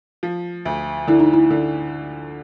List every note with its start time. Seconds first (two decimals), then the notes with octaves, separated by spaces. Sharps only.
0.23 F3
0.65 D2
1.08 D3 E4
1.20 D#4
1.33 E4
1.50 D3